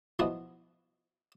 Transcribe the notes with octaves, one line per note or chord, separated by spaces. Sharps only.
B1 F3 B3 E4 F#4 D#5